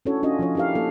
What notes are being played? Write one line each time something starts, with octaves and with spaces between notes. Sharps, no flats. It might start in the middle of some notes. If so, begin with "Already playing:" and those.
C#4 D4 E4 F#4 A4 C#5
C#4 D4 F4 F#4 D#5
F3 F4 C#5
E4 F4 G4 A#4 F5
A#3 A4